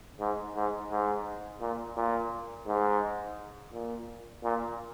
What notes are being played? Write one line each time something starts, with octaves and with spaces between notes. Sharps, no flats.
G#2
G#2
G#2
A#2
A#2
G#2
A#2
A#2